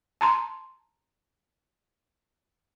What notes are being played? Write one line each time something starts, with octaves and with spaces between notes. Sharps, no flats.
A5 A#5 C6